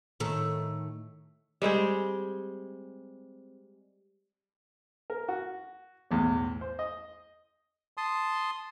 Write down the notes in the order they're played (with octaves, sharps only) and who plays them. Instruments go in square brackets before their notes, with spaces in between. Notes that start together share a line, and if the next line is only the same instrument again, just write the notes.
[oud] A2 D#3 A4
[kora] G3 G#3 C4 G#4
[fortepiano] A#4
F#4
B1 E2 A2
C5
D#5
[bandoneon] A5 C6 D#6